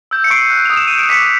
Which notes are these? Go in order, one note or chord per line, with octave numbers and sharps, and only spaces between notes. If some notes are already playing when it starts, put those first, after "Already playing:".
E6 G6
C#7
C#6 C7 D7
F#6
D#6 F7
E7
G6 D#7
D7
D6 B6 C#7